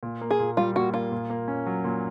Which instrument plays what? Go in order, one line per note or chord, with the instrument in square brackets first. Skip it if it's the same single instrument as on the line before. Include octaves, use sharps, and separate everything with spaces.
[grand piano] A#2
A#3
[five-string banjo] G#4
[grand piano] A#2
[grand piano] G3 [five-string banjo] F4
[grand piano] A#2 [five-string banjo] F#4
[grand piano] A#3 [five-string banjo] F4
[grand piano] A#2
A#3
C#4
F#3
A#2